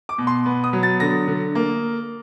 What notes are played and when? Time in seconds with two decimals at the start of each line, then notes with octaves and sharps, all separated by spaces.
0.09 D6
0.18 B2
0.27 C6
0.46 B3
0.64 D#6
0.73 F#3
0.83 A6
1.00 D3 A#6
1.28 D3
1.55 A#3